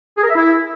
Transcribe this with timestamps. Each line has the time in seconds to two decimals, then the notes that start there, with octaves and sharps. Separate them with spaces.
0.18 G#4
0.24 A#4
0.29 E5
0.35 E4